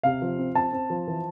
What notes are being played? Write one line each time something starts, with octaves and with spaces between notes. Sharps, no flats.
C3 F5
F3
C4
C4 A5
C4
F3
E3